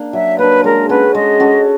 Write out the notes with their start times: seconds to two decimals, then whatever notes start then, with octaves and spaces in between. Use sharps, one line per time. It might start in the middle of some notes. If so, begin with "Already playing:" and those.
Already playing: A#3 D4
0.13 F#3 E5
0.38 A#3 D4 B4
0.64 G#3 A#4
0.89 C#4 F#4 A4 B4
1.15 G#3 D#5
1.40 C#4 F#4 A4